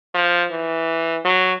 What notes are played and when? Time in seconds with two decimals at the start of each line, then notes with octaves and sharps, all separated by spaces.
0.14 F3
0.51 E3
1.24 F#3